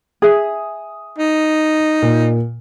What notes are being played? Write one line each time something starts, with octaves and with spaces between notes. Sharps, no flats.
G#4 E5 D#6
D#4
A#2